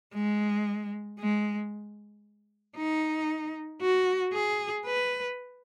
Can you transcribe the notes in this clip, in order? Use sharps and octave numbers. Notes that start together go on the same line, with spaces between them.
G#3
G#3
D#4
F#4
G#4
B4